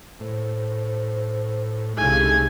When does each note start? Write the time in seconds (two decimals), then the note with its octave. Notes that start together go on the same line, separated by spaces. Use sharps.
0.20 A2 C5
1.97 C2 C#3 G#3 A3 D#4 E4 G#5